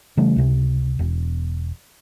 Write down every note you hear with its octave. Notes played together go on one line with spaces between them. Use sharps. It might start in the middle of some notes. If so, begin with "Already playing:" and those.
C#3 E3 G3 A3
C#2 C3
E1